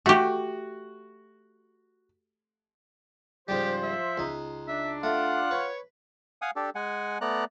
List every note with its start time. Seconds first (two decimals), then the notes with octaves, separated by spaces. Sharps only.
0.06 A3 F#4 G4
3.48 G#2 C#3 F3 G3 G4 C5
3.83 E5
4.18 C#2 D#4
4.68 D4 E5
5.03 A3 F4 F#5
5.51 B4 C#5
6.42 F5 F#5 G#5 D#6
6.56 D4 G4 A4
6.75 G#3 F#5 G#5
7.21 A3 B3 D5 A#5 F#6